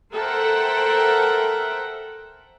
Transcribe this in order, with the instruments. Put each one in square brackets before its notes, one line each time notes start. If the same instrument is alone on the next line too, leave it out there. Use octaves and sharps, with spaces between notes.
[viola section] A4 A#4 C5 E5 F#5 G5